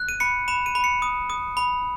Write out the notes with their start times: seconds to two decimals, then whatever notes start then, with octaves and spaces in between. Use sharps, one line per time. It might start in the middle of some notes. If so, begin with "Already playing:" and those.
Already playing: F#6
0.09 D#7
0.20 B5 C#7
0.48 B5 E7
0.66 D#7
0.75 B5
0.84 C#7
1.02 D#6
1.30 D#6
1.57 B5